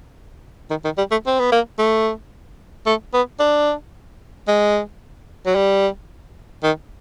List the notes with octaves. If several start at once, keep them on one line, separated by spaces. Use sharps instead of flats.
D#3
D#3
G3
A3
C4
B3
A#3
A3
A3
B3
D4
G#3
F#3
G3
D#3